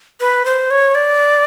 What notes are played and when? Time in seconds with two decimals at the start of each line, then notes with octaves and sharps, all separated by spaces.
0.20 B4
0.45 C5
0.70 C#5
0.95 D5